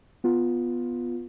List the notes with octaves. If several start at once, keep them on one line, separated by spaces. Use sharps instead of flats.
B3 F4